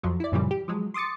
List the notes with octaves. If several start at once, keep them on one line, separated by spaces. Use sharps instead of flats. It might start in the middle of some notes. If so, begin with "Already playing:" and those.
F2 F3 F#3
E4 D5
F#2 A#2 C#3 E3 F3 G3
G4
F3 F#3 G#3
C6 D6 D#6 A6 C#7